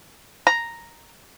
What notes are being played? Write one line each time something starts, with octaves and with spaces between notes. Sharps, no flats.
A#5